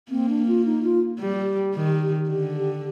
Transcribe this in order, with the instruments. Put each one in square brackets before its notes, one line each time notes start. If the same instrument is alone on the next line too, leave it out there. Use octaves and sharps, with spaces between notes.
[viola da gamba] A#3 [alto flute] C4
[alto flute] D4
F4
D#4
F4
[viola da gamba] G3 [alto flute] G4
[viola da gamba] D#3
[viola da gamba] D3 [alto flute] G4
[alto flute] G4